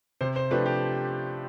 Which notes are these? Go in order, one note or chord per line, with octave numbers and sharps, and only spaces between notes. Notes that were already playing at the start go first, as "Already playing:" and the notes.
C3 C5
C5
F3 A3 D4 G4 B4
G4